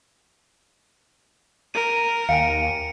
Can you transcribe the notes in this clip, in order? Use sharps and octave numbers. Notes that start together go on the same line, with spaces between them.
A#4 D#7
D#2 F5 G5 G#5 C#7 D7